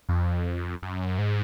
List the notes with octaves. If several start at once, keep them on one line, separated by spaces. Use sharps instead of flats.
F2
F#2
G#2